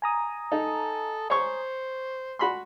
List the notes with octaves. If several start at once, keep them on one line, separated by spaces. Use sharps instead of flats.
G#5 A#5 D#6
D#4 A4
C5 C#5 C#6
F#4 B5 C6